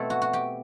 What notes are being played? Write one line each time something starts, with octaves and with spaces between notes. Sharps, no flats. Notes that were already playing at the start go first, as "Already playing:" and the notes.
Already playing: B2 A3 C4 E4 A4
F#4
F#4
G4